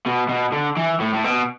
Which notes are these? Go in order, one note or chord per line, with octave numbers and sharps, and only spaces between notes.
B2
B2
D3
E3
A2
A2
B2